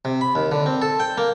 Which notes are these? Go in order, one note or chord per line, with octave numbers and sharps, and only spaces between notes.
C3
B5
D#2
D3
C4
A4
G5
A#3